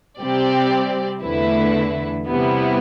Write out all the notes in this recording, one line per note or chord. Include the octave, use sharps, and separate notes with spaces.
C3 G3 C4 G4 D5
E2 D3 A3 E4 B4
C3 G3 B3 E4